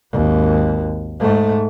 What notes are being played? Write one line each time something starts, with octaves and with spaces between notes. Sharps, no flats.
G#1 D#2
G#2 A3